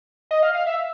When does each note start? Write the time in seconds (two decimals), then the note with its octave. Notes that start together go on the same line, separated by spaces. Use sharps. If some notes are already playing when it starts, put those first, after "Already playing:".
0.31 D#5
0.43 F5
0.55 F5
0.66 E5